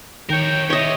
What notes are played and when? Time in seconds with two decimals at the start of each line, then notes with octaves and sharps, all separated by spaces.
0.30 D#3 A#4 C#5 G5
0.70 G4 C#5 D#5 E5